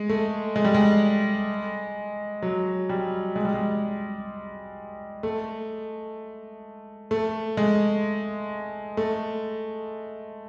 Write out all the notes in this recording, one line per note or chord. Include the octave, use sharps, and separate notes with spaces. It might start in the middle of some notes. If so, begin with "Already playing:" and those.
Already playing: G#3
A3
G#3
G3
G#3
F#3
G3
G#3
G3
G#3
A3
A3
G#3
A3